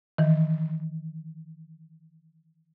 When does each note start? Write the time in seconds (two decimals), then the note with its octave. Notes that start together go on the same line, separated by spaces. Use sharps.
0.18 D#3 E3